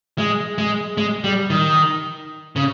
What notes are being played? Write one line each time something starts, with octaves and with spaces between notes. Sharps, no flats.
G#3
G#3
G#3
G3
D#3
C#3